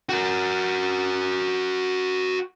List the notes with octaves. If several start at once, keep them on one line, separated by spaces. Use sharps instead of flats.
F#4 A#4